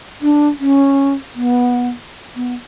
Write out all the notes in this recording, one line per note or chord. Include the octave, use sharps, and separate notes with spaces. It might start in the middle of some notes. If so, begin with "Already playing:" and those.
D4
C#4
B3
B3